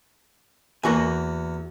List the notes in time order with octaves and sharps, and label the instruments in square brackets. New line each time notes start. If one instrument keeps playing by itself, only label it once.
[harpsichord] E2 [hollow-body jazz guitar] A#3 F#4 G#5